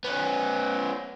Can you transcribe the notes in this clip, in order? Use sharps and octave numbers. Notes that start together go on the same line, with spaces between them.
B3 C#4